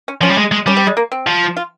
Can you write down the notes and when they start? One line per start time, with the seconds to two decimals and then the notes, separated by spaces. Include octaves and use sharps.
0.08 C#4
0.21 F3 C#4
0.30 G3
0.38 G#3
0.52 G#3
0.66 G3 C#4
0.77 C4
0.87 G#3
0.97 A#3
1.12 C4
1.27 F3
1.57 F4